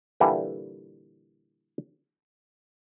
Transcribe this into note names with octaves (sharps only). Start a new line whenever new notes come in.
A#2 D3 E3 G3